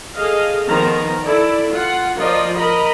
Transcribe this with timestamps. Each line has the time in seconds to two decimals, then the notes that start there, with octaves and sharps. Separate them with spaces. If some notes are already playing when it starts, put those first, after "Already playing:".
0.16 G#4 A4 D#5 F5
0.68 D#3 F3 B3 A#4 A#5
1.22 E4 A4 D5
1.70 F4 F#5
2.17 F3 F4 A#4 D5 D#5
2.56 A#4 D#5 A#5 B5